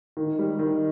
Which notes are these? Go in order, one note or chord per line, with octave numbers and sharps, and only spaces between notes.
D#3
G3
D#3